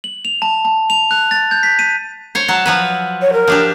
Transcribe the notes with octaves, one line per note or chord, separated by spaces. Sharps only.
F#7
F7
A5
A5
F7
F#6
A6
G6
B6
D#7
C5 C#5
F#3 A5
F3 F#3 B4
C#5
A#4
F3 D4 G4